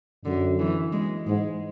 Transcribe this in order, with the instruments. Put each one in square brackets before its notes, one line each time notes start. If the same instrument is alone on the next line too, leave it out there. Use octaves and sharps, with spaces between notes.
[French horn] F#2 [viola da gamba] D3
[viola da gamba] E3
G#3
[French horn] G#2 [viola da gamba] G#3